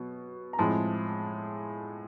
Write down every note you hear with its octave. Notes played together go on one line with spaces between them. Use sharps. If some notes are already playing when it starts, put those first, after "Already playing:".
Already playing: B2 F#3
A#5
A2 F3 G#3 C4 A5